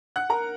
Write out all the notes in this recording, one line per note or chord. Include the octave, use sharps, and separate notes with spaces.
F#5 F#6
A#4 A#5